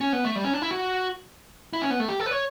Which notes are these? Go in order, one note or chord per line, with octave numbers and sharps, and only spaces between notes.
C#4
B3
A3
G3
C#4
D4
E4
F#4
E4
C#4
B3
A3
G4
A4
B4
C#5